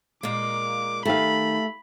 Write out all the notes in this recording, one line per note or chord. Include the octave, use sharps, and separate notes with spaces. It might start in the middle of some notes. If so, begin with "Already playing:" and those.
A#2 G#3 A#3 D6
D#3 A3 G4 F5 B5